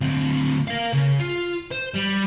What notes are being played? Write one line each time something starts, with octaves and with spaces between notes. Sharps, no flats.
D2 C4
A#4 F5
C#3
F4
C5
G3